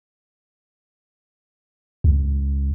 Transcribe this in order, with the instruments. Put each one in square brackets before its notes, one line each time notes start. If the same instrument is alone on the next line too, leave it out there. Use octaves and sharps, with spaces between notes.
[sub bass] C#2